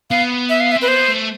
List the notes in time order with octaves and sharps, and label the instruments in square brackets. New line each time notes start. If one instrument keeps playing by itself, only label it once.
[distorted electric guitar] B3 [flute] F5
[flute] E5
F5
E5
[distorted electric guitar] C4
[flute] B4
[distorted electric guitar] B3 [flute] C5
[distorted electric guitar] A3